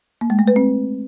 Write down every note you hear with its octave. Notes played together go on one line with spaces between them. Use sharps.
A#3
G#3
A3
B4
C4